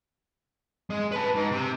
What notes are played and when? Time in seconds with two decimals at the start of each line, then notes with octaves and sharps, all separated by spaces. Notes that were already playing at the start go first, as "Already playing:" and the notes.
0.90 G#3
1.12 B4 A5
1.35 G#2
1.51 C3